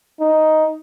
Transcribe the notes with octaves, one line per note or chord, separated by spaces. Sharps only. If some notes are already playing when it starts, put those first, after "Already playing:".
D#4